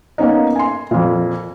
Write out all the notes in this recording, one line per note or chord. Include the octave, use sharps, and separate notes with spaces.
A#3 B3 C#4 D#4
G#5 C6
F2 A#2